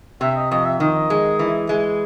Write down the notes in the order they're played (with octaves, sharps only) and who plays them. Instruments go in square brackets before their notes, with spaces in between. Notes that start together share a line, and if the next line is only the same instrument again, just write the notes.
[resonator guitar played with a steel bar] C3 [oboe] E5
[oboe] D#5
[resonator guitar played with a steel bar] F2 [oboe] D#5
[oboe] E5
[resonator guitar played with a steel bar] D#3 [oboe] D#5
[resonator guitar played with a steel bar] G#3
E3
G#3